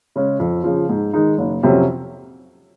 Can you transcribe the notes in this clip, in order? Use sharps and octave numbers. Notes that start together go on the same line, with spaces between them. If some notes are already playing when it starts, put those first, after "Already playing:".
C#3 G#3 C#4
F2
C#3 F3
G#2
D#3 G#3 D#4
F#1
F2 C3 F#3 C#4